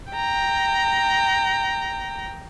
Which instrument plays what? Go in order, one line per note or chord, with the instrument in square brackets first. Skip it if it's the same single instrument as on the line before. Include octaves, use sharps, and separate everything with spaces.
[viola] G5 A#5